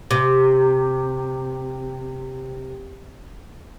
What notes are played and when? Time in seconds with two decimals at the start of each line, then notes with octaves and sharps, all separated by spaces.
0.11 C3